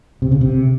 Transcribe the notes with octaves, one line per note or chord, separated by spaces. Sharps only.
C3
C#3
C3